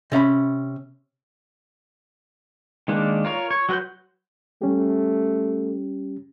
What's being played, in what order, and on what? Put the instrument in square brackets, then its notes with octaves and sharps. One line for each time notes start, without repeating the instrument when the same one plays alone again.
[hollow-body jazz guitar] C3 C#4 F5 B5
[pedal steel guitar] D#3 G#3 A#3 D4
F4 A#4 C#5
C#5
F#3 F#4 B4 C6 G6
[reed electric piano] G3 C#4 G4 [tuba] A3